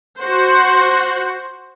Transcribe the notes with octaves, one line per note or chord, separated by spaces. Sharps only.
F#4 C5